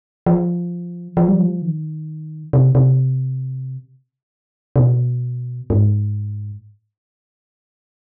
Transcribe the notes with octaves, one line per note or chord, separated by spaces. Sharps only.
F3
F3
G3
F3
D#3
C3
C3
C3
B2
G#2